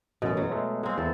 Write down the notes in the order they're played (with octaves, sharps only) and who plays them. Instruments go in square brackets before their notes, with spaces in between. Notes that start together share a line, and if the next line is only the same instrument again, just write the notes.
[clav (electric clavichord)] A1 F#2 [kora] B2
[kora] F#3
[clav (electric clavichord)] G#3 A3
[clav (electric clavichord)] G#3 [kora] A#3 C4
[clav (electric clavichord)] E2 [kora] A4